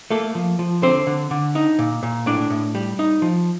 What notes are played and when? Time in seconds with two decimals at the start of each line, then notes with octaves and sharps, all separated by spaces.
0.10 A3 A#3 A4
0.35 F3
0.59 F3
0.82 D3 C4 C5
1.07 D3
1.31 D3
1.55 D#4
1.79 A#2
2.03 A#2
2.26 A2 D4 D5
2.50 A2
2.75 G3
2.99 D#4
3.22 F3